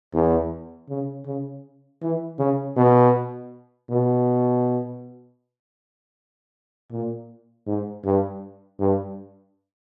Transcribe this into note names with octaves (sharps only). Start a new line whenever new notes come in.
E2
C#3
C#3
E3
C#3
B2
B2
A#2
G#2
G2
G2